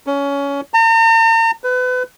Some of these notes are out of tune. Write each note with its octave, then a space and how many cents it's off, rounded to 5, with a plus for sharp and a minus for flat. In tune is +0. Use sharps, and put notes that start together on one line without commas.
C#4 +20
A#5 -45
B4 +30